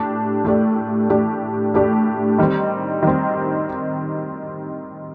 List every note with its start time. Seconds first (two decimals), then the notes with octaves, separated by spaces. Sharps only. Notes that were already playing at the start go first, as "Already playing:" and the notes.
Already playing: A2 A3 D4 G4
0.44 A2 A3 D4 G4 D5
1.09 A2 A3 D4 G4 D5
1.74 A2 A3 D4 G4 D5
2.39 D#3 G3 C4
3.03 D#3 G3 C4